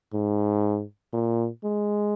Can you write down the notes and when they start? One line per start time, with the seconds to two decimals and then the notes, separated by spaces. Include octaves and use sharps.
0.13 G#2
1.13 A#2
1.64 G#3